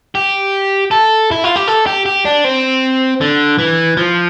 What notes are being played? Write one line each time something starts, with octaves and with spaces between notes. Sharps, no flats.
G4
A4
E4
F4
G4
A4
G4
G4
D4
C4
D3
E3
F3